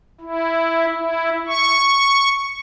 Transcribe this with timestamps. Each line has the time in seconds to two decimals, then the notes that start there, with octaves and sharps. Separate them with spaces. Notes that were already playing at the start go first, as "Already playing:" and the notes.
0.21 E4
0.94 E4
1.48 C#6